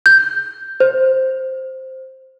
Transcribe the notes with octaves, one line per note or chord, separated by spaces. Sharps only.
G6
C5